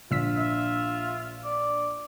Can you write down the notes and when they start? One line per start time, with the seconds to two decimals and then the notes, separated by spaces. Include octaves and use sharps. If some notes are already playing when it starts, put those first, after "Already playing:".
0.11 A#1 D4 F4 E6 B6
0.37 E5
1.44 D5